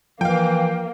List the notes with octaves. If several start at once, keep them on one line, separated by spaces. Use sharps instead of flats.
E3 F3 A#3 F5 G5